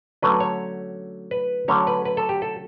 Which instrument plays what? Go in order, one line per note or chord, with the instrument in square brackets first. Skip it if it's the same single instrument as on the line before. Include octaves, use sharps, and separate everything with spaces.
[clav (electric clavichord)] D3 F#3 A3 C#4 B4
C#5
B4
D3 F#3 A3 C#4 C#5
B4
B4
A4
G4
A4